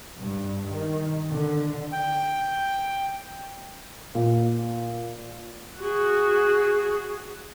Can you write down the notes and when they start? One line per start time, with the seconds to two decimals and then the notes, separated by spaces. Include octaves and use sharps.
0.19 G2
0.72 D#3
1.30 D3
1.92 G5
4.15 A#2
5.79 F#4 G#4